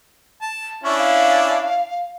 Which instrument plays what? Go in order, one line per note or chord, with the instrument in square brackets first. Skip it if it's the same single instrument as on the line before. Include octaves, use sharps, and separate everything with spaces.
[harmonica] A5
[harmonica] C#4 D4 E4 [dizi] C#6
[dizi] F5